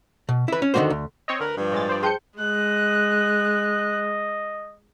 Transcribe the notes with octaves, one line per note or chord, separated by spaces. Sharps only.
B2
E4 B4
C#4
D3 D#3 F3 A#3 F#4 C5
D2
C4 C#5 D#5
D2 A#4 B4
G2 F3
A2 G#3 A6
C5 D5
G#4 C5 G5 A5 G6 C#7
G#3 D#5 F#6